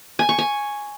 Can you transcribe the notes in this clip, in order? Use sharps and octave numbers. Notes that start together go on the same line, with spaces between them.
G#5
C#6
G#5